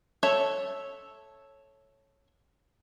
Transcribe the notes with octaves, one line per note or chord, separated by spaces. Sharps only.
A4 C#5 E5